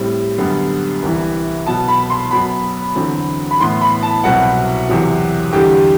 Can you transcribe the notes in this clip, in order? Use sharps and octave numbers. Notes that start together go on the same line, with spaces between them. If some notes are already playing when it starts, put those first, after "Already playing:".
Already playing: A2 G3 C4
F#2 D3 G3 B3
C2 C3 E3
B2 F#3 B3 A5
B5
C6
F#2 F#3 B3 B5
E2 D3 F#3 C4
B5
A2 E3 B3 C6
B5
A5
C2 B2 F#3 C4 F#5
E2 C3 F#3
E2 D3 G3 G4